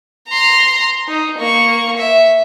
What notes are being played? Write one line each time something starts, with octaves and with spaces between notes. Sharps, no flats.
A#5 C6
D#4
A#3 C#6
E5